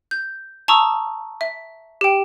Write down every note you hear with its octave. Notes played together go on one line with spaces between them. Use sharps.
G6
A5 A#5 C#6 D#6 E6
E5
G4 G5